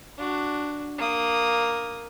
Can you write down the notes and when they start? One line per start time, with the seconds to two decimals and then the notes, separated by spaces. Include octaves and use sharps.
0.18 D4 F#4
0.98 A#3 D#6